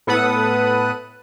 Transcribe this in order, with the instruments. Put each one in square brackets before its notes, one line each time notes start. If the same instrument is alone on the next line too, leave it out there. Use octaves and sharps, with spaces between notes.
[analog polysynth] A2 B3 A4 B4 F#5 D#6